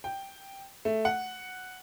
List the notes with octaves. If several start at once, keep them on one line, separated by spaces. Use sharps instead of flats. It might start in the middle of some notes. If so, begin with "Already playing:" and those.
G5
A3
F#5